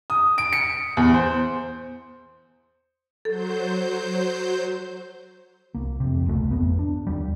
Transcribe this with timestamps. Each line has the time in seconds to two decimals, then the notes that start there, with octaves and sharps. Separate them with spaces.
0.10 D#6
0.38 D7
0.53 C#7
0.97 E2
1.14 C5
3.25 F#3 A4 C5 G6
5.74 C2 A#3
6.00 F2 C3
6.26 G1 C#2 C#3 A3
6.51 G#1 F2 A3 B3
6.79 D4
7.07 D#2 G3